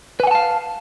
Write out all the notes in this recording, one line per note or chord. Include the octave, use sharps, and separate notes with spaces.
B4 F5 F#5 G#5 A5